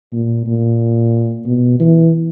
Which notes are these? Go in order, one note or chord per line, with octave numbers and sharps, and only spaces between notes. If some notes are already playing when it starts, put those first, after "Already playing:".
A#2
A#2
B2
E3